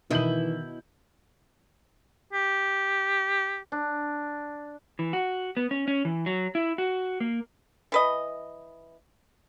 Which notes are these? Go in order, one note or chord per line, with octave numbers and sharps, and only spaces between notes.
B2 D#3 E3 E4 D#5 G6 F#7
G4
D4
E3
F#4
B3
C#4
C#4
E3
F#3
E4
F#4
A#3
E3 B4 D#5